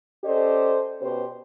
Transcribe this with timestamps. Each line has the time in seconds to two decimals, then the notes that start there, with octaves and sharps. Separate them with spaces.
0.24 C#4 G4 A4 C5 D5 D#5
1.01 B2 C#4 G4 B4 C5